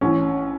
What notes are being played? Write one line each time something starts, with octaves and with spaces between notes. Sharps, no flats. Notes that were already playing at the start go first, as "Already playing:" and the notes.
A1 C#4